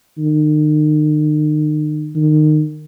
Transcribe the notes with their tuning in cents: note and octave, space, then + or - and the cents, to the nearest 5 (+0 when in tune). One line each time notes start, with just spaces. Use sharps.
D#3 -40
D#3 -25